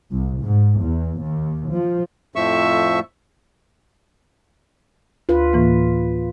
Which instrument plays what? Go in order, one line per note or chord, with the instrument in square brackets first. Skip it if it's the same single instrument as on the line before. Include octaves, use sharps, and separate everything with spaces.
[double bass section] C2
G#2
E2
D#2
F3
[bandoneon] F2 A2 F3 E5 C#6 E6
[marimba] D2 [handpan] F4 B4
[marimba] A2 E3 A#3